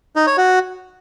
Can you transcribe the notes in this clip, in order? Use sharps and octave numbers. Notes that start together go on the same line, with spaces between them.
D#4
C#5
F#4